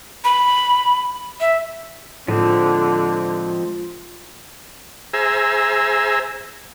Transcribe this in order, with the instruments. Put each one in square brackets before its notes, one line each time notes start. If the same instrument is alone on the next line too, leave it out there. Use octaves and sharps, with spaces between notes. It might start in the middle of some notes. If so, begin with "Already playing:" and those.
[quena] B5
E5
[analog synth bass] A2 [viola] D3 [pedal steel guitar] F3 G#3 C4 [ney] F4
[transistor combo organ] G#4 C5 E5 G#5 A#5 E6